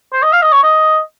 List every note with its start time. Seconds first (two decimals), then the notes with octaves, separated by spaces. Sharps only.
0.13 C5
0.23 D#5
0.32 F5
0.42 D#5
0.53 C#5
0.63 D#5